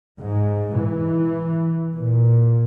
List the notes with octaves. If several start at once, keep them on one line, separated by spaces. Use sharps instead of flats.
G#2
E3
A#2